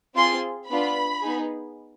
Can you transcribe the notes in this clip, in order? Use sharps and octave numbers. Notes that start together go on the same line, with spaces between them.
C4 F4 G#4 C6
B3 D4 F4 B5
B3 D#4 G#4